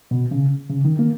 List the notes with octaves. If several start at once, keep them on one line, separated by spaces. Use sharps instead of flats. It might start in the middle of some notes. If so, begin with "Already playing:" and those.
B2
C#3
C#3
D#3
A#3